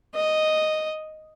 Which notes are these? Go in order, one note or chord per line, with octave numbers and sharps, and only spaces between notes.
D#5